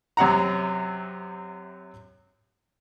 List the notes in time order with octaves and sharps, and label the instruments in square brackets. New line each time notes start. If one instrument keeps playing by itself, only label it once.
[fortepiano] F#2 C3 F#5 A#5